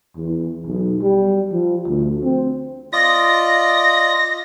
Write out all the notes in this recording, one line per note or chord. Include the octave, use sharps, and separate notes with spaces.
E2
B1
G3
F3
D2
C4
F4 D5 D#5 A#6